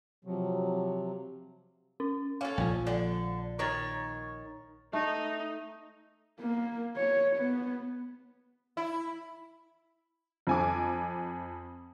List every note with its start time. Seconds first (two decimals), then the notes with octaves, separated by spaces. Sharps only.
0.25 C3 F3 F#3
2.00 C#4
2.41 C#4 A4 F5
2.58 A#1 F3
2.87 D3
3.59 D#3 C#5 C#6 A6
4.93 A3 D#4
6.40 A#3
6.96 C#5
7.37 B3
8.77 E4
10.47 F2 G#5 D6